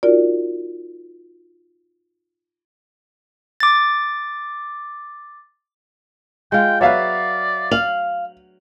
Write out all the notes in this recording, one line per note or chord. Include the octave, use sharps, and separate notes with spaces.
D#4 F4 F#4 A#4 D5
D6 A6
G#3 F4 G5
F#3 B4 C#5 D5 E5 F5
F5 F#7